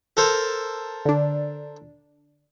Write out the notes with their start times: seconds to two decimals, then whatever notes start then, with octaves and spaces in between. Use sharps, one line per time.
0.17 A4 A#4 C5
1.05 D3 D4